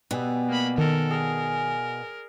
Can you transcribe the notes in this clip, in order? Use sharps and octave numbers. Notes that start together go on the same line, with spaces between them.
B2 G3 B3 G#5 E6
A#3 B5
D#3 A4 A#4
G#4 A#4 G#5